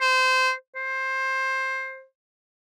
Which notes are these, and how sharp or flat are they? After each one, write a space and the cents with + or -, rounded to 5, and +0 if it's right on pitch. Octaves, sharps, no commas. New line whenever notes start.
C5 -20
C5 +15